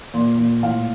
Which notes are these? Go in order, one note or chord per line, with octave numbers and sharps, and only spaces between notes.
A#2
A#2
A2 F5